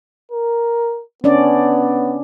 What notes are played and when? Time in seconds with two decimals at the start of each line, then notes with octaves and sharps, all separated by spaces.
0.32 A#4
1.24 B3 C#4 D4 D5